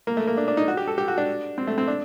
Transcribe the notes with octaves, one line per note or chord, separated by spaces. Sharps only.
A#3
A3
A#3
D4
D4
D#4
F#4
G4
A4
G4
F#4
D4
C4
A3
C4
D4